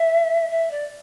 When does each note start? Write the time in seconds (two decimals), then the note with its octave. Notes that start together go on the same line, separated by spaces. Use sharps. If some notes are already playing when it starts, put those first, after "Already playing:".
Already playing: E5
0.51 E5
0.71 D5